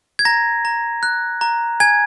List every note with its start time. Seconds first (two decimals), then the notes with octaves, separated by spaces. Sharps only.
0.19 G#6
0.25 A#5 A#6
0.65 A#5
1.03 F#6
1.41 A#5
1.80 G#5 G#6